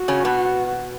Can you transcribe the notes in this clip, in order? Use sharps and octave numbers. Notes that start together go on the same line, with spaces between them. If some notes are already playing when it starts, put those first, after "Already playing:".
Already playing: F#4
C#3 C#4
B2 B3